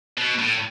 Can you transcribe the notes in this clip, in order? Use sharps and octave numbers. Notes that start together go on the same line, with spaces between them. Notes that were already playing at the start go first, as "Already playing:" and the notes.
B2
A2